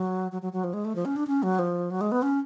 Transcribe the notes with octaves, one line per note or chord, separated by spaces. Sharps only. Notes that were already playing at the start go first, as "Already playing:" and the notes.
Already playing: F#3
F#3
F#3
F#3
F3
G#3
A3
F3
C#4
D4
C#4
F#3
F3
F#3
G#3
B3
C#4